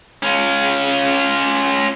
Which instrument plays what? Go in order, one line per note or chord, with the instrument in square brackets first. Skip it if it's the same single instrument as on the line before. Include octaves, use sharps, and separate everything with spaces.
[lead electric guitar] C#4 F4